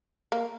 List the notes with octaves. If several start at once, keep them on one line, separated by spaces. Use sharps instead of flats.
A#3